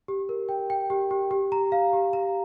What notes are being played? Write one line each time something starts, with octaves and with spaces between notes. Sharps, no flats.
G4
A#4
G5
G5
G4
G4
G4
A#5
F5
G4
A#5